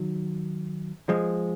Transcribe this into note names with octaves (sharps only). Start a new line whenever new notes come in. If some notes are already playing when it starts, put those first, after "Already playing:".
Already playing: D#3 F#3
F3 G#3